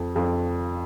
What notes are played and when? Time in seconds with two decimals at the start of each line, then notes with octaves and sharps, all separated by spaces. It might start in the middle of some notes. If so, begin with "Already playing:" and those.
Already playing: F2
0.16 F2